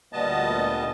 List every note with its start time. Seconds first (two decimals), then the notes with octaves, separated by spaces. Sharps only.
0.13 D2 A#2 G3 B3 D#5 A5